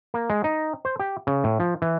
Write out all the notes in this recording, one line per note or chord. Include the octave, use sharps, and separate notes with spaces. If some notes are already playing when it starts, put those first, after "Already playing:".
A#3
G#3
D#4
C5
G4
C#3
A2
F3
E3